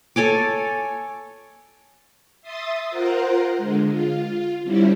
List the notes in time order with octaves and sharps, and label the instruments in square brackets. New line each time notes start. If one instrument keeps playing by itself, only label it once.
[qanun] A4 C#5 G#5 D6
[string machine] E5 C6 D#6 A6
F4 A#4 C5 F#5
D3 G#3
F4
D3 G3 C4 C#4 E4